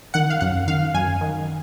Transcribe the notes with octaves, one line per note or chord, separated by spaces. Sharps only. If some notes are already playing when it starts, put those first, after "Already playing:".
D#3 F#5
F5
F#2 F#5
D#3 F5
F#2 G#5
D#3